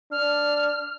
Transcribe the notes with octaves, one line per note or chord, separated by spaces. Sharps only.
D4 F6